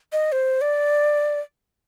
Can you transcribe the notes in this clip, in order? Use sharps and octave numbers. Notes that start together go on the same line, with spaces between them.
D#5
C5
D5